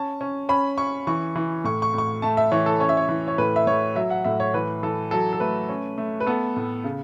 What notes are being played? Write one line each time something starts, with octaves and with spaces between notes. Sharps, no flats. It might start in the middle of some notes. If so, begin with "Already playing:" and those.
Already playing: C#4 A5
C#4
C#4 B5
C#4 C#6
E3 C#6
E3
A2 C#6
C#6
A2 C#6
A3 A5
E5
E3 C#5
A4
C#4 C#5
E5
C#5
E3
C#5
A2 B4
E5
A2 C#5
F#3 E5
F#5
A2 E5
C#5
E3 B4
E3 A4
F#3 A4
A4
A3 B4
C#4
A3
B4
B3 A4
A2
C#3